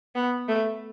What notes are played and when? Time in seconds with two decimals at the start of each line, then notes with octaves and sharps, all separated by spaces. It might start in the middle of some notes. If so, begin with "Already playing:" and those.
0.15 B3
0.49 A3